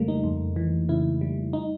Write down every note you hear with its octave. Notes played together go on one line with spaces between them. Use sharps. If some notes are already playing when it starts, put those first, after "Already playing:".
Already playing: F2 C#3 G3 A3 A#3
D#4
F2
E3
C#3 E4
G3
D#4